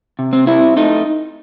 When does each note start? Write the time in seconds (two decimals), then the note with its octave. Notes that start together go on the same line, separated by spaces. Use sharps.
0.19 C3
0.33 C4
0.47 C4 E4
0.77 A3 D#4